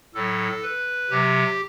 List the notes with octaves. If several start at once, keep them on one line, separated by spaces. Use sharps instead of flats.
A2 F#3 A4
B4
C3 F#3 G4